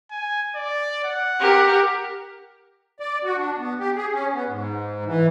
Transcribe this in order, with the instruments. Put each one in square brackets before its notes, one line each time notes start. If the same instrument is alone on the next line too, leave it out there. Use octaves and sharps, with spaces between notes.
[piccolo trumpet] G#5
D5
F#5
[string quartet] G4 A#4
[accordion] D5
F#4
D4
B3
G4
G#4
C#4
B3
G#2
E3